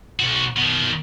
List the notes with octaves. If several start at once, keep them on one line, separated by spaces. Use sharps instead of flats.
B1 F#4
B2 D#3